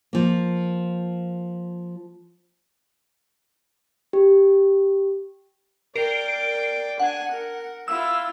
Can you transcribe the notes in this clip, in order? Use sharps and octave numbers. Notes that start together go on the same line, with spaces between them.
F3 A#3
G4
A#4 D5 G5 C7 D7
D4 F#5 G#5
A#4
E4 F4 E6